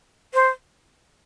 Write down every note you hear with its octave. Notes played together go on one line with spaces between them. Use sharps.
C5